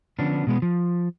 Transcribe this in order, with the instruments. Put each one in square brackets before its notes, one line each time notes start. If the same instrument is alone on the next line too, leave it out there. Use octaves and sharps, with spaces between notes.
[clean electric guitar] D3 F3 B3 C#4 D4
B2 G#3 B3
F3